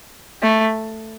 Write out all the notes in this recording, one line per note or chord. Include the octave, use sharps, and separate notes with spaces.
A3